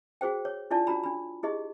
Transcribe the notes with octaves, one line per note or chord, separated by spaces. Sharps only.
F#4 G#4 C5 G5
C#5
D4 E4 F4 D5 A5
D4 F#4 A#5 B5
D4 B5
E4 G4 G#4 D#5